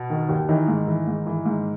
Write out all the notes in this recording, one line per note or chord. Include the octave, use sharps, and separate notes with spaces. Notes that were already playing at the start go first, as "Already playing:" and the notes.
Already playing: B2
D#3
D#2
D#3 E3 D#4
G#2
E3
G#2
E3
G#2